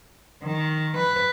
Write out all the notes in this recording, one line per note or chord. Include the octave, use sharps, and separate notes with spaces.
D#3
B4